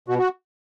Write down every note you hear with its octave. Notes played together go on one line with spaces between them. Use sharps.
B2 F#4
F#4